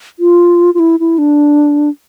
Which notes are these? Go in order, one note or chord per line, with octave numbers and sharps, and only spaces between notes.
F4
F4
E4
E4
D4